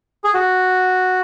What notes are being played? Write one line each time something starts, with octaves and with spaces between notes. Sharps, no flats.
G#4
F#4